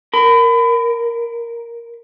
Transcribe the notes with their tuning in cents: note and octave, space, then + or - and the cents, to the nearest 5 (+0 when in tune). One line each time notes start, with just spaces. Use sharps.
A#4 +0 B5 +30